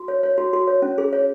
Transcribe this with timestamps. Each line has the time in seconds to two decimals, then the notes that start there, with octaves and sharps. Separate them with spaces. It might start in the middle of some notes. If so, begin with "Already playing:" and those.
Already playing: F#4
0.08 C#5
0.23 C#5
0.38 F#4
0.53 F#4
0.68 C#5
0.82 C#4
0.98 G#4
1.13 C#5